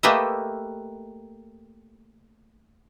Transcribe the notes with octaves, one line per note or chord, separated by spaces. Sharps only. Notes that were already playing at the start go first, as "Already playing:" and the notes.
A3 A#3 G4 B4 D#5 E5